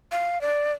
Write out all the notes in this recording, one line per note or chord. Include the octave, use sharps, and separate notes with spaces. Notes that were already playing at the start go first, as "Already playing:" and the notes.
F5
D5